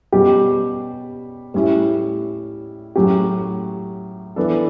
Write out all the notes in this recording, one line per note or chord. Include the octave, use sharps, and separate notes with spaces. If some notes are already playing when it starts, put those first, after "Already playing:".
B2 G3 C#4 G4
A2 G3 C#4 E4
A2 F#3 C#4 G4
E3 B3 D4 A4